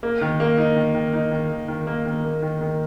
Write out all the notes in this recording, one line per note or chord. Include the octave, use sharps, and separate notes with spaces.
A#3
D#3
A#3
D#4
D#3
D#3
D#4
D#3
D#3
D#3
A#3
D#3
A#3
D#3
D#3